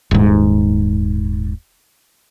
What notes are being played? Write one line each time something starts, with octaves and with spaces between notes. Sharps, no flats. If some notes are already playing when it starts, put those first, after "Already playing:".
D#1 G#2